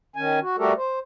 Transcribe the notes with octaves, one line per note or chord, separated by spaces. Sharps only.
D#3 C#4 G#5
F#4
G3 A3 F#4 G4 A4 A#4
C5